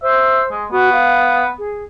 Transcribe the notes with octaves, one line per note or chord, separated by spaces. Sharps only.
C5 E5
G#3
B3 F#4
F5
G#4